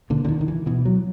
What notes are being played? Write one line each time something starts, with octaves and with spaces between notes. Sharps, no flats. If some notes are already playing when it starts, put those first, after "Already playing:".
A#2 D3
D3
D#3
D#3
E3
B2 E3
F#3